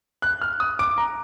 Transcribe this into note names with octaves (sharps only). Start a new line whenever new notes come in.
F#6
F6
D#6
D6
A#5